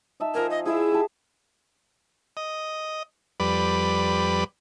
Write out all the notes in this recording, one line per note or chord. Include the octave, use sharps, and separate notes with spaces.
D#4 E5 A5
F3 A#4 G#5
D#5
E4 G#4 E5
G4 A5
D#5
F2 G3 B4 D5 B5